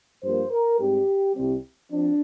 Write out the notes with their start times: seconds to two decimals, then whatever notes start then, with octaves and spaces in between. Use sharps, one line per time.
0.24 G2 F3 A#3 C5
0.52 A#4
0.80 G#2 G3 C4 G4
1.36 C2 C3 G3 C4
1.92 F3 C4 D4